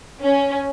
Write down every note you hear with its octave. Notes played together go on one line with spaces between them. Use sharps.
C#4